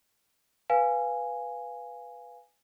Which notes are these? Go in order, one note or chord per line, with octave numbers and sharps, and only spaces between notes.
B4 F5 G#5